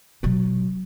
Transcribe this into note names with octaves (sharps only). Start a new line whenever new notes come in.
B2 F#3